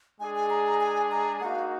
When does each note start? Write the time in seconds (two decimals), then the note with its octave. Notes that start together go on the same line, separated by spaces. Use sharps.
0.20 G#3 D4 G#4 G#5
0.36 G#5
0.50 A#5
0.66 A#5
0.81 G#5
1.12 A#5
1.41 A#3 D#4 F#4 F5 F#5